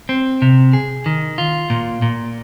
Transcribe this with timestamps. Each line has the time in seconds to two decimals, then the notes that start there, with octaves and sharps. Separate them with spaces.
0.09 C4
0.42 C3
0.73 G#4
1.06 D#3
1.38 F4
1.70 A#2
2.02 A#2